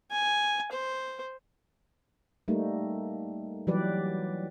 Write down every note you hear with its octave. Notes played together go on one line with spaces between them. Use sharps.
G#5
C5
G3 A3 A#3 D#4
E3 F#3 G3 G4 B4 D5